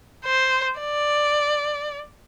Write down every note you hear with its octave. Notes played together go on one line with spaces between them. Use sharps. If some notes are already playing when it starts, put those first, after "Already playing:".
C5
D5